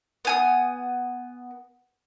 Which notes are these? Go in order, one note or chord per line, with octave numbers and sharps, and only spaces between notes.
B3 G#5 D#6